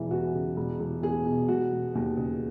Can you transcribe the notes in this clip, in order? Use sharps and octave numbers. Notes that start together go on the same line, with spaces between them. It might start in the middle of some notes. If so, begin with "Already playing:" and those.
Already playing: E1 E3
E2 F#4
C#3
E1
E1
E2 G#4
B2
E1 F#4
E1
D#2
C#3